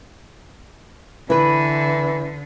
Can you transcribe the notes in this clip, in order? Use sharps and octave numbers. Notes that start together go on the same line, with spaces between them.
D3 E3 E4 B4